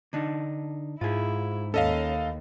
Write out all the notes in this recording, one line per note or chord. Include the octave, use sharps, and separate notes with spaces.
D3 D4 D#4
G#2 E4 F4 G#4
D#2 C#4 A4 D#5 F5